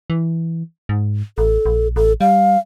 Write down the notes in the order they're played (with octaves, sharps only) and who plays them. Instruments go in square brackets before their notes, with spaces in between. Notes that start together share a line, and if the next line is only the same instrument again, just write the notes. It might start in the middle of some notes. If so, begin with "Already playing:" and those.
[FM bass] E3
G#2
[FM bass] A1 [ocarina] A4
[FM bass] A#1
[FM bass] A1 [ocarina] A4
[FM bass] G3 [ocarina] F5